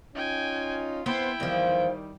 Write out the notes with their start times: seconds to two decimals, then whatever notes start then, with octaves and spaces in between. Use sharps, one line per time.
0.15 C#4 D#4 F4 G5 G#5
1.06 B3 E4 C5 G5
1.40 E2 D#3 F3 G3